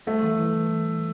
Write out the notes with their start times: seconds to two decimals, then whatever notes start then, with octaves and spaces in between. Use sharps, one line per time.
0.07 G3 A3
0.23 E3
0.39 E3